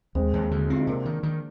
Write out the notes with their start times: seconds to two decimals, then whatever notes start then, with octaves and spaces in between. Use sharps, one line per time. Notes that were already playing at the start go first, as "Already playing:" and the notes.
0.15 D#2 G#3 C4
0.33 D#2
0.51 D3
0.70 C4 F4
0.80 D#4
0.87 C3 A#3 D4
1.05 D#3
1.23 D#3